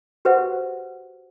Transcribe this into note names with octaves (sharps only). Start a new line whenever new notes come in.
F#4 G4 B4 C5 E5 F#5